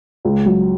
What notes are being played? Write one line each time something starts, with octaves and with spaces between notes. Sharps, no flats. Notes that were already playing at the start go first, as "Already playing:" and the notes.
C#2
F#3